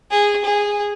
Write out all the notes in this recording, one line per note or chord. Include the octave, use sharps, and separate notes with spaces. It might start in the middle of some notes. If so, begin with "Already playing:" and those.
G#4
G#4